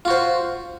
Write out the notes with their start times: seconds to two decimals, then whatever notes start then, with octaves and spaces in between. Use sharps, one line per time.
0.05 F4
0.08 F#4
0.10 C5